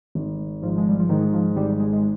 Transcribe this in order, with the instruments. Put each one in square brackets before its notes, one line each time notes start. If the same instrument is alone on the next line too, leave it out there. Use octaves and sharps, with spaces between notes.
[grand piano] G#1
[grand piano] G#2 [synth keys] F3
[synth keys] G#3
G3
F3
[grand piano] G#2 [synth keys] D#3
[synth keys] F3
[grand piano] G#1 [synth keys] G3
[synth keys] G#3
G#3